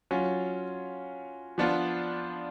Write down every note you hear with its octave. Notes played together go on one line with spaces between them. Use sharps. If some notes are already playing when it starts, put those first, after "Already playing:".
F#3 C#4 F4
F3 B3 D4 F4